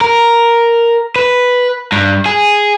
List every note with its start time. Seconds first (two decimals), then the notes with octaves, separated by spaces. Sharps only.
0.01 A#4
1.16 B4
1.92 G2
2.26 G#4